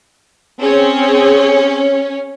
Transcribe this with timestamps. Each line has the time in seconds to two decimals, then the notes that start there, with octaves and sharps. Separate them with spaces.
0.64 C4 C#4 G#4